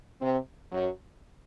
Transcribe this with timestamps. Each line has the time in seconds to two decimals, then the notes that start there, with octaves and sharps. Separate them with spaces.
0.22 C3 C4
0.72 F#2 F#3